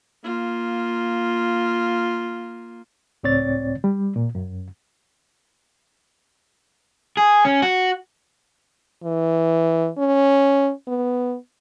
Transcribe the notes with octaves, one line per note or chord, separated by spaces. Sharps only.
A#3 F4
C#2 A2 C4 C#5 D5 A6
G3
A#2
F#2
G#4
C#4
F#4
E3
C#4
B3